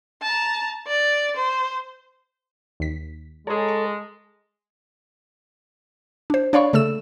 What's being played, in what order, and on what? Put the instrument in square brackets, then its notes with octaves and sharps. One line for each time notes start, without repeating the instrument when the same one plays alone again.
[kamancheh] A5 A#5
D5
C5
[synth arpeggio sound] D#2 B6
[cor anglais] G#3 [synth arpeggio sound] G#4 C#5 [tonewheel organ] A4 A5 A#5
[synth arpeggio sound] C#6
[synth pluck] D4 C5
D4 C#5 D5 F5 B5 C#6
C#3 A3 A4 E6 E7